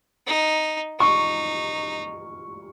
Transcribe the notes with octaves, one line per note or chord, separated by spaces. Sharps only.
D#4
D#4 C#6